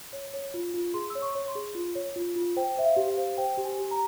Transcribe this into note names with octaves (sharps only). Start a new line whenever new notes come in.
C#5
C#5
F4
F4
G#4 C6
E6
C#5
C#6
C#5
C6
G#4
F4
C#5
F4
F4
C5 G5
C5 E5
F5
G4
F5
C5
C5 G5
G4
G#5
G4
A#5